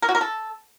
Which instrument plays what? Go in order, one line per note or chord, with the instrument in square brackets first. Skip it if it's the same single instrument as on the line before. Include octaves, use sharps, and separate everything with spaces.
[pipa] A#4
F#4
A#4
A4